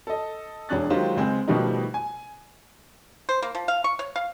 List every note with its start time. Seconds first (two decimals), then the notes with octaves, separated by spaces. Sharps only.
0.07 A4 D#5
0.69 E1 C#4 D4 F#6 A6
0.90 D#3 F#3 G#3 F4 G4 C5
1.17 C#2 G#3 C4 G#4
1.48 B2 D#3 F3 G3 A3 D#4
1.94 G#5
3.29 C5
3.43 A#3
3.55 F3
3.68 F5
3.84 C#6
3.99 C#5
4.16 F5